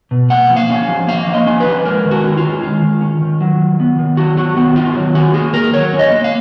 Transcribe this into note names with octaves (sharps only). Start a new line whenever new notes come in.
B2
A#3 F#5
F3
F5
C#4
F3
A#3 F5
F3
D#5
C#4
B4
F3
G#3 A#4
D#3
F#4
C#4
F4
D#3
G#3 F4
D#3
C#4
D#3
F#3
D#3
B3
D#3
F#3 F#4
D#3 F#4
B3 F#4
D#3 F4
F#3
C#4 F#4
A#3 G#4
D#3 A#4
F#3 C#5
C#4
D#5
A#3
F5